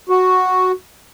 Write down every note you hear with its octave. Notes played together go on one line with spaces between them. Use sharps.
F#4